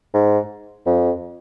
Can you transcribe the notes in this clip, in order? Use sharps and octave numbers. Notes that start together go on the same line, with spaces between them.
G#2
F2